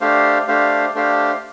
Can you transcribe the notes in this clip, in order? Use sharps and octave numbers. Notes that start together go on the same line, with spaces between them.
A3 D4 G4 C5 F5
A3 D4 G4 C5 F5
A3 D4 G4 C5 F5